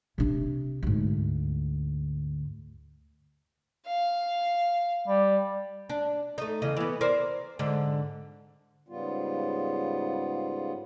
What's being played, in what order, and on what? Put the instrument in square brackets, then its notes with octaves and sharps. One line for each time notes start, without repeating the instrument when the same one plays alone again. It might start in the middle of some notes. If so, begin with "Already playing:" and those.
[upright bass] C3 D4
D2 G#2
[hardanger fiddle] F5
[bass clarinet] G3
[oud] D4
A3 D#4
E2 C#3 D#5
E3 B3
A#4 C5 D5
G#2 D3
[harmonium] G#2 C#3 G3 B3 F4